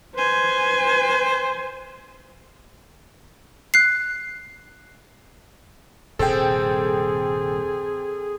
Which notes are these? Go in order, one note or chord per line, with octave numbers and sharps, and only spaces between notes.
B4 C5 G#5
F#6 C7
D#1 G2 C3 C4 G#4 A4 G5